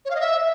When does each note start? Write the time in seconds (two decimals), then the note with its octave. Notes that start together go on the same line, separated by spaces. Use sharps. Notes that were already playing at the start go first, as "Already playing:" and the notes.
0.05 C#5
0.10 F5
0.16 D#5
0.21 E5